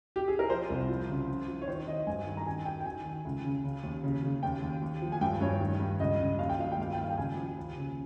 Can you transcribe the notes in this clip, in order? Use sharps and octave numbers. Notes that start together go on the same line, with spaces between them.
G4
G#4
A#4
F3 C5
C2
F3
C#3
F3
F3
C#5
D#3 C5
D#3 D#5
G2 G#5
D#3
A#5
D#3 G#5
D#3 G5
G5
D#3 G#5
D#3
C#2
C#3
C#3
D#2
C#3
C#3
D#2 G5
D#2
D#2
F3
G#5
G2 G5
G2 C#5
D#3
G2
C#2 D#5
C#2
D#2 F5
G5
F3 F5
G5
G2 F5
D#3 G5
F5
G5
C#2 G#5
F3
D#2
C#3